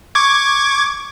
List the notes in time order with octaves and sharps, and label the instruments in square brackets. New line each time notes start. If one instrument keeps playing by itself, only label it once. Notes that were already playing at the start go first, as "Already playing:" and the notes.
[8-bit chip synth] C#6 D6 G#6